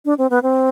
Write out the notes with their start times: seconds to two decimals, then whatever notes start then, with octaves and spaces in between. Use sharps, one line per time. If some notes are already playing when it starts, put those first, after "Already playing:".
0.05 D4
0.18 C4
0.30 B3
0.43 C4